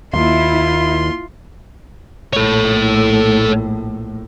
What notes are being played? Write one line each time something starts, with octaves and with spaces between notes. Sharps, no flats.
D#2 A#3 E4 F4 F5 C6
A#1 A2 A4 C#5